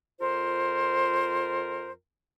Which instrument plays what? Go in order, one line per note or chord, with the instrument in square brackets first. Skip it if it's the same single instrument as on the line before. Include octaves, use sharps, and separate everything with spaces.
[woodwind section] F2 F4 A#4 C5